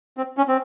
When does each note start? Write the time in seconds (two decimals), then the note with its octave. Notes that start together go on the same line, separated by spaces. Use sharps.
0.17 C4
0.37 C#4
0.48 C4